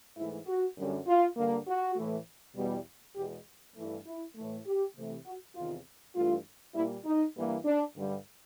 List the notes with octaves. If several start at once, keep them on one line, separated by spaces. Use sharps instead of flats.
G#2 E3 A3 E4
F#4
F#2 D3 G3
F4
G2 D3 G3 A#3
F#4
A2 E3 A3
E2 B2 G3
E2 B2 G#3 G4
G2 E3 A3
E4
A2 E3 A3
G4
C3 E3 A3
F#4
E2 C3 D#3 F4
G2 E3 A3 F4
A#2 G3 A#3 E4
D#4
G2 E3 G3 A#3
D4
G2 D3 G3